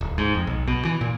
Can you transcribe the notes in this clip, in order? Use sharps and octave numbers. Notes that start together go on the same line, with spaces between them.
D1
G#2
F2
B1
B2
E3
A#2